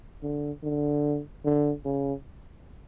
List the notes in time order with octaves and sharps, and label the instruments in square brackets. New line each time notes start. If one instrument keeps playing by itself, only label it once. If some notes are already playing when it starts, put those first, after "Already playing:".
[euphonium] D3
D3
D3
C#3